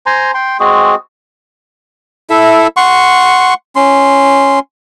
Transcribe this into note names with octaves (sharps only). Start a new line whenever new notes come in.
C5 G#5 A#5 C6
G5 C6
G#3 C4 F#4 G#4
E4 A4 E5
F#5 C6 C#6
C#4 C6